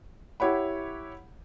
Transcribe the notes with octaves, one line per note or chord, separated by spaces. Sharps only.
E4 G4 C#5 F#5 B5